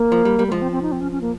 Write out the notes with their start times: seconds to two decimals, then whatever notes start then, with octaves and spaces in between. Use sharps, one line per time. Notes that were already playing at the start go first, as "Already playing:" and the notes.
Already playing: A#3
0.12 F3
0.25 G3
0.39 G3
0.48 A#3
0.52 F3 G#3
0.62 C4
0.72 C4
0.82 D#4
0.92 C4
1.01 C#4
1.12 C#4
1.21 A#3